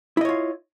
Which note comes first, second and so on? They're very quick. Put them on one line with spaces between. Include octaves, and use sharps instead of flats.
E4 D#5 C#5 F4